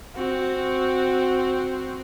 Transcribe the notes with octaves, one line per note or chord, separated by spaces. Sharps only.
C4 F#4